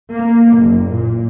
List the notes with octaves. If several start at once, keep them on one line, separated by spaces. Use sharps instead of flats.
A#3
F#1
A#2